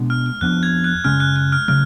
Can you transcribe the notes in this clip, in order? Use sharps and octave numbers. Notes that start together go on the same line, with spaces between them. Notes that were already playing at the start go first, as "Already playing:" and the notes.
Already playing: B2 G#3 B3 D4
F6
F6
F2 F3 B3 D4 F#6
G#6
F#6
F#2 C#3 G#3 C#4 F6
F#6
F#6
F6
C#3 F#3 A3 F6